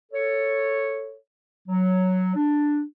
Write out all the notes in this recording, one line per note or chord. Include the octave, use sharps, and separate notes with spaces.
A4 C#5
F#3
D4